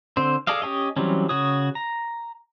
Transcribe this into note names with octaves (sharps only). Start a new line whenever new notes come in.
D3 C4 C5
G#4 A4 D5 D#5 F5
C#4 G4 C#5 D#5
E3 F#3 G3 C4 C#4
C#3 F#4 C#5 D#6
A#5